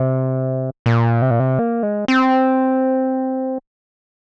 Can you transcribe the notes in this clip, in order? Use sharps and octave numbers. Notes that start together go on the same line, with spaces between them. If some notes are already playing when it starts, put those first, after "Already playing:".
Already playing: C3
A#2
C3
A#2
C3
A#3
G#3
C4